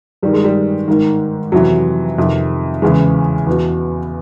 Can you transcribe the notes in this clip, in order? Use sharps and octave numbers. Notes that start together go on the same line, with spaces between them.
G2 D#3 G3
G#3
G3
G#2 D#3
F2 C3 E3 F#3
F2 C3 D#3
E2 C#3 E3 G#3
E2 B2